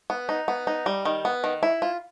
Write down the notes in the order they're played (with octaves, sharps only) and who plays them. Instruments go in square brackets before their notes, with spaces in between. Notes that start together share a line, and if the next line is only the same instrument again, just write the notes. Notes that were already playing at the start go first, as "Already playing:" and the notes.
[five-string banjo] B3
D#4
B3
D#4
G3
D#3
B3
D#3
E4
F4